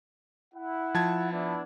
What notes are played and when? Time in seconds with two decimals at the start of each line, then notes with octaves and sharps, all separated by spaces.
0.52 E4 F#5
0.94 F3 A5 G#6
1.31 B3 D4 E4